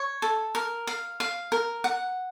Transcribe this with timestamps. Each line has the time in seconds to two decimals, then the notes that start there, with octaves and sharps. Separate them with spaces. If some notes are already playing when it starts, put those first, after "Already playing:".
Already playing: C#5
0.22 A4
0.55 A#4
0.87 F5
1.20 F5
1.52 A#4
1.84 F#5